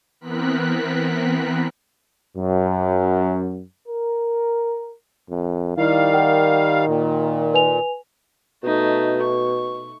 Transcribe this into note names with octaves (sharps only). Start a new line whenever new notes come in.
E3 B3 C4 A#4 F#6 B6
F#2
A#4
F2
D#3 G3 E4 F5
A#4 F#5 G5
A#2
B4 G#5 F7
B2 A3 D#4
C#6